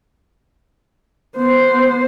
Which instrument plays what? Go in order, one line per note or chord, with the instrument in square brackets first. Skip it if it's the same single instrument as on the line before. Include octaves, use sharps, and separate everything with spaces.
[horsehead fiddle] B3 C5